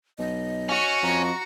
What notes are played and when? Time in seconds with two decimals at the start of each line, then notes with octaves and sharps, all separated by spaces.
0.19 B1 D#5
0.69 C#4 F#4 C#6
1.03 F2 A#5